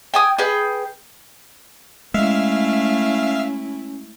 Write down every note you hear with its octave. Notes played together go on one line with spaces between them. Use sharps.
G5 G#5 D#6
G#4 B4 G5
G#3 A3 C#4 E4 E5 F5